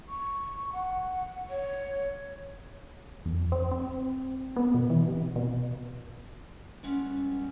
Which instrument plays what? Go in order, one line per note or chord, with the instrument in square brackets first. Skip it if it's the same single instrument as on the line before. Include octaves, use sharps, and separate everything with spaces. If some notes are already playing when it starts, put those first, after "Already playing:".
[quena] C#6
F#5
C#5
[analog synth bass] F2
C4
C4
B3
B2
E3
C3
B2
[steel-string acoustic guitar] G3 G#3 B3 C#4 E4 F#5